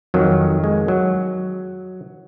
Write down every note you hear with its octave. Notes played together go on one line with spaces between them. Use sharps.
F2 D#3 F#3
G#3
F#3